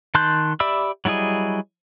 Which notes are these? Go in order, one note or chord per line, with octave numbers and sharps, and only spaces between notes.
D#3 A5 C6 F#6 G6
G4 D5 E5 B5 E6
F#3 G3 E4 G#4 D#5